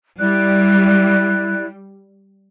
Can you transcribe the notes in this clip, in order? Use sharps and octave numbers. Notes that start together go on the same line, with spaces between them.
G3 E4 D5 F#6